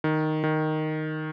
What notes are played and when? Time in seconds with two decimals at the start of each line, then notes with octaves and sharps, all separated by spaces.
0.04 D#3
0.44 D#3